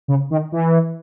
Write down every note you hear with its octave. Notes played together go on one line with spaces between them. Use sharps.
C#3
D#3
E3